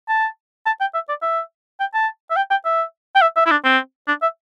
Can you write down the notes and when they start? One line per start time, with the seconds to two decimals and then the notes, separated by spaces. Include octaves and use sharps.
0.09 A5
0.66 A5
0.80 G5
0.94 E5
1.09 D5
1.22 E5
1.80 G5
1.94 A5
2.31 E5
2.37 G5
2.51 G5
2.65 E5
3.16 G5
3.22 E5
3.36 E5
3.46 E4
3.51 D4
3.65 C4
4.08 D4
4.22 E5